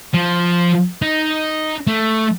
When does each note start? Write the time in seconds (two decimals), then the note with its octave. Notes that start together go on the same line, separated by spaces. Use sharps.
0.14 F3
1.02 D#4
1.87 A3